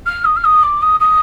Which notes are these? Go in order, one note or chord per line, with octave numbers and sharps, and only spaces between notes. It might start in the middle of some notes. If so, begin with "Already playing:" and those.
F6
D#6
F6
D#6
D6
D#6
D#6